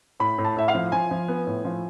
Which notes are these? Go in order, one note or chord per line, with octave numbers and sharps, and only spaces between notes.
A2 B5
A2
A5
A2 E5
F5
F3
F3 G#5
F3
B3
A2
F3